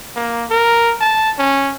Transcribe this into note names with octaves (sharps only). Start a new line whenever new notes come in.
A#3
A#4
A5
C#4